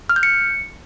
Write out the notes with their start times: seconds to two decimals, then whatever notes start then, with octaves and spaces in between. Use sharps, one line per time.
0.09 F6
0.16 G6
0.23 C#7